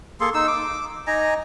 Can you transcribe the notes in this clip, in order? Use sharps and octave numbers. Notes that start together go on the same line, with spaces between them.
A#3 G#4 A4 C6
D#4 E6
D6
D#4 D#5 G#5 A#5